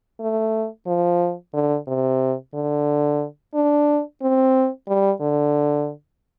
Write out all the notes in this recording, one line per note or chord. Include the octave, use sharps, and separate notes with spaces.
A3
F3
D3
C3
D3
D4
C4
G3
D3